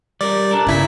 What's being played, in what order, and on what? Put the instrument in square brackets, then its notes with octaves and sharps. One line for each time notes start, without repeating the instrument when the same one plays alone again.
[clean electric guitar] G3 A#4 [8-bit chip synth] D5
[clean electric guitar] D4 A4 A#4
[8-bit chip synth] G1 E4 B6 [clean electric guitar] A#2 C#3